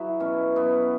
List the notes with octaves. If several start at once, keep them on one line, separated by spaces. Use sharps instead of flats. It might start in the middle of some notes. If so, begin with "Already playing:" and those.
Already playing: F#3 E4 F#4 G#4 B4
B2 C#4
F#3 B3